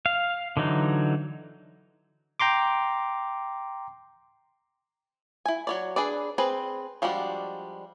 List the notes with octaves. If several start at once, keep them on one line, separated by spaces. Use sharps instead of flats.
F5
D3 E3 F#3 D#4
G5 A#5 C6 D6
E4 G#5
F#3 C#5 D5
D4 G#4 B4 D5
C4 G#4 B4
F3 G3 G#3 D4 F#4